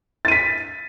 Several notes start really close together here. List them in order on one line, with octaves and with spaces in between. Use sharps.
A6 D#7 B6